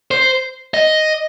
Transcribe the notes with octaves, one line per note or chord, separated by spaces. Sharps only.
C5
D#5